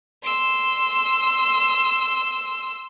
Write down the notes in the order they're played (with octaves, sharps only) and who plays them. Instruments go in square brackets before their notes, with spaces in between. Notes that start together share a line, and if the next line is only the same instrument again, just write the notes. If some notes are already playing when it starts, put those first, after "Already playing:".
[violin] C6 E6